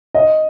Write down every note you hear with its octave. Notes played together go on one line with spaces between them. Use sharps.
D#5